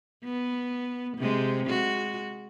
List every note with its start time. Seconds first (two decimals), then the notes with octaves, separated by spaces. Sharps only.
0.24 B3
1.17 C3 G#3
1.66 G#3 F#4